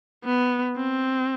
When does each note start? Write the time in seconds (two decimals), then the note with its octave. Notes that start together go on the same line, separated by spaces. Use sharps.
0.25 B3
0.77 C4